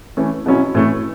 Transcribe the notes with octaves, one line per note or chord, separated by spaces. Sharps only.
E3 A3 C#4
B2 F#3 C#4 E4
A2 E3 A3 C#4